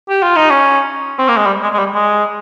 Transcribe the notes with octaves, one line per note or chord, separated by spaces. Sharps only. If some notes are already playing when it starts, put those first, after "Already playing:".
G4
F4
D#4
C#4
C4
A#3
G#3
G3
G#3
G#3
G3
G#3